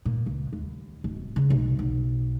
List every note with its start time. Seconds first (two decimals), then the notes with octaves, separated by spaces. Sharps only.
0.05 A#2
0.26 C#2
0.53 D#2
1.04 D1
1.36 C#3
1.50 B1
1.79 B1